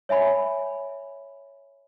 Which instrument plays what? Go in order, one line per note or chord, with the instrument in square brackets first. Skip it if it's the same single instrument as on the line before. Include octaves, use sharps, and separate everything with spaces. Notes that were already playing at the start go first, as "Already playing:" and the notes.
[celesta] C#5 E5 G#5 B5